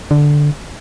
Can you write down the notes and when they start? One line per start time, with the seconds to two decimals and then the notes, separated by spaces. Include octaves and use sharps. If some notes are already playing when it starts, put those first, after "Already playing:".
0.11 D3